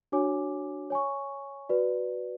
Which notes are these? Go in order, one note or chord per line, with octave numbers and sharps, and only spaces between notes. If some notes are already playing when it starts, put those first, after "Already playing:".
D4 F#4 C#5 G#5 D6
C#5 G#5 C#6
F#4 B4 D5